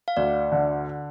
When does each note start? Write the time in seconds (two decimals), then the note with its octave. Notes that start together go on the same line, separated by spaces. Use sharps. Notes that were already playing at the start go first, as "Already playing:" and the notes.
0.08 F5
0.17 D2 D5
0.52 D3